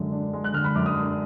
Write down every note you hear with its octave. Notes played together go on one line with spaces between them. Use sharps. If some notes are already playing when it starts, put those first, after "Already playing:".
Already playing: F#2 D3 G#3 D4
D4
G#3
F#6
D3 F6
B5
F#2 D6
D#6
D4